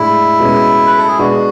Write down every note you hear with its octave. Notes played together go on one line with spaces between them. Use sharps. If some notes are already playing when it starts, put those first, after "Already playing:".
Already playing: A2 G#3 D4 E4
B2 G#3 C#4
B4
A4
G#4
B2 G#3 D4 F#4